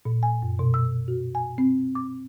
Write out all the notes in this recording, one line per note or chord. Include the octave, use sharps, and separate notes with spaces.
A#2
G#5
F#2
B2
E6
F#4
G#5
C4
D6